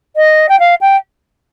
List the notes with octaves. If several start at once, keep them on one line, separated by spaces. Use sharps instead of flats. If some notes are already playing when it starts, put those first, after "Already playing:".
D#5
G5
F5
G5